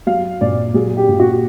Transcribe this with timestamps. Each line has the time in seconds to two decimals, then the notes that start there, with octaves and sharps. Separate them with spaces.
0.07 F#3 F5
0.41 A#2 D5
0.74 F#3 G#4
0.97 G4
1.08 A#2
1.19 F#4